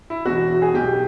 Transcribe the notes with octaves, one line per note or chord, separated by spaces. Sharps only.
E4
E1 E2 B2 F#4
G#4
B1 B2 G4